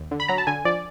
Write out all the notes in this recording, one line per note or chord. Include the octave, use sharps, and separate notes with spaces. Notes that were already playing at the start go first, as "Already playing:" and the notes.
Already playing: D#2
D3
B5
F#3 A#5
A5
D3 G#5
F3 D5